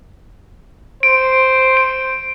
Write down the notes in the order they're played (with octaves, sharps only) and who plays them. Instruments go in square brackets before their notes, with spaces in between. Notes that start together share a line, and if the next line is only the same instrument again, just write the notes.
[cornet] C5 [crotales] D7
[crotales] D7